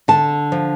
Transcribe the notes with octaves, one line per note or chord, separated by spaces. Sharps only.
D3 A5
F3